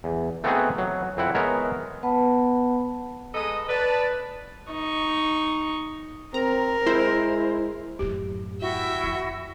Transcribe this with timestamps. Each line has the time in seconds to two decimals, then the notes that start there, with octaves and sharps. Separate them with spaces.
0.04 E2
0.44 A3 B3 C4 D#4 F#4 G#4
0.78 F#3
1.17 F2 C4 E4 F#5
1.35 G#3 B3 A#4 C#5 E5
2.03 B3 B4 F#5 A5 B5
3.34 G#3 A4 B4 D#5 A#5 D#6
3.68 B4 D5 A5
4.72 D#4 C#6
6.34 C4 A#4 A#5
6.86 G#3 E4 C5
7.99 F#2 A2 G4
8.61 E4 F#4 E5 G5 E6
9.03 F2